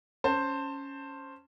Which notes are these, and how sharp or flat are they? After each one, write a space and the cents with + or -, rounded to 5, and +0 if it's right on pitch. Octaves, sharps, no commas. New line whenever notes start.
C#4 +0 C5 +5 A5 +25